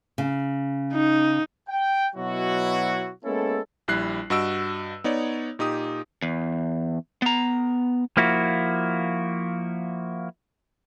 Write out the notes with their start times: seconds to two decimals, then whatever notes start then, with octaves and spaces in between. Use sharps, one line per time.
0.18 C#3
0.93 D#4
1.69 G5
2.16 B2 F#3 E4 F#4
3.24 G#3 A#3 B3 C#4 E4 A4
3.88 A#1 G3 E4 F#6 C7
4.30 G2 F#4 D#5 E6 D7
5.04 B3 D#4 C#5 D5
5.59 A#2 D#4 G4 D#6
6.22 E2
7.22 B3 A#5
8.17 F3 A#3 E4 F#4